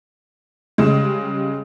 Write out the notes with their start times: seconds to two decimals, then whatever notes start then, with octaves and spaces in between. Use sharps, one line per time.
0.78 C#3 G3 G#3